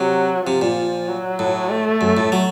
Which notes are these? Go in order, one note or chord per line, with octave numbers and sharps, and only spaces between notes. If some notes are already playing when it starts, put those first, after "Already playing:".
Already playing: C3 F#3
C3 F3
A#2
F#3
A2
A3
F#2
A2
F#3